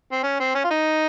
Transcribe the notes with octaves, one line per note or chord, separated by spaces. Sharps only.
C4
C#4
C4
C#4
F4
D#4